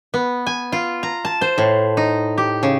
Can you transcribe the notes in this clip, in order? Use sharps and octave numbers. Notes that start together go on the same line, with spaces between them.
B3
G#5
F4
A#5
A5
C5
A2
D#4
G4
C#3